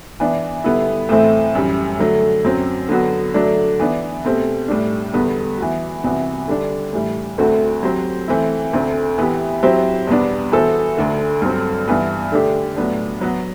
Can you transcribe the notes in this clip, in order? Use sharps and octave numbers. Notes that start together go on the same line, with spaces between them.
E3 B3 D4
D3 G3 B3 E4
A2 E3 A3 C4 E4
F#2 E3 G3
D3 F#3 A3
F#2 F#3 C4
D3 F#3 B3 F#4
D3 F#3 A3 D4
E3 B3 D4
B2 A3 C4 G4
A2 G3 D4
E2 D3 G3 B3
E3 B3 F#4
C2 C3 E3 B3 F#4
D3 G3 D4
A2 E3 G3
D2 D3 A3 C4 F#4
F#3 C4 G4 C5
E3 A3 C4 E4
D2 D3 A3 C4
E3 B3 E4 G4
F#3 C4 E4 G4 C5
E2 B2 G3 B3 D4
E3 B3 F#4 A4 C5
D2 D3 A3
G2 D3 F#3 C4
G2 E3 B3
D3 A3 D4 G4
A2 F#3 B3 D4
F#3 B3 F#4